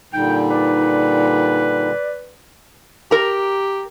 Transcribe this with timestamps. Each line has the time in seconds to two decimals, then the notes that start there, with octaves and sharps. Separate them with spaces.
0.13 A#2 D3 G3 D#4 G5
0.50 B4 D5
3.11 G4 A#4 A#5